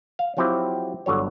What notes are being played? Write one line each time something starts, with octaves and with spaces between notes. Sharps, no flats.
F5
F3 F#3 C4 E4 G4
G1 D3 F#3 C#5